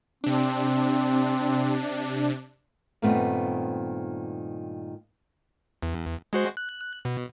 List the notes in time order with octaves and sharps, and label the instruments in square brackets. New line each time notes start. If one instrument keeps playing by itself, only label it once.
[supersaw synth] C3 D4 [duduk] C4
[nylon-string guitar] G2 A#2 D#3 A3 B3 C4
[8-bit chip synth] E2
G#3 F#4 C5
F#6
B2